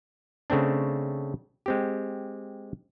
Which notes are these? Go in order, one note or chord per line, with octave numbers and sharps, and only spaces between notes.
C#3 A3 C4 D4
G#3 C4 G4